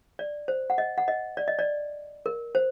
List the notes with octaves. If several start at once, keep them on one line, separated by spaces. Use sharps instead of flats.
D5
C5
F#5
D#5
F#5
D#5
D5
D#5
D5
A#4
C5